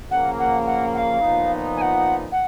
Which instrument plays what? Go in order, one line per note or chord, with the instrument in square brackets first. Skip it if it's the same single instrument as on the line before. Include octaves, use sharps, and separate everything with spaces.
[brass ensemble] C#3 F3 A#3 [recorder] F#5
[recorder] F#5
F#5
F#5
F5
[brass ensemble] A#2 F3 B3 D#4
[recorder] G#5
F#5
F#5